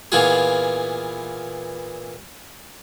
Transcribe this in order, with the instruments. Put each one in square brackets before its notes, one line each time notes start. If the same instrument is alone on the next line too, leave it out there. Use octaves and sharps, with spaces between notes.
[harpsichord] A#2 E3 B3 E4 F4 G#4